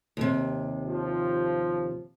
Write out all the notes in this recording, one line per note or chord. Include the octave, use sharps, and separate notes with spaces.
D#2 C3
F3